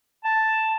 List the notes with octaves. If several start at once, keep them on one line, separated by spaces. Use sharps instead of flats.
A5